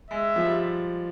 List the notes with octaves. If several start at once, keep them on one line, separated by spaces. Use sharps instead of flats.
G#3 E5
F3
G3